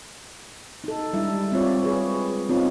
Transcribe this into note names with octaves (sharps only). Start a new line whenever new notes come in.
D#4 A4
G3 G#3 D4 E4 E5
C4 F4 C#5 D5
G#3 G#4 B4 C#5
B3 C4 D#4 F4 C#5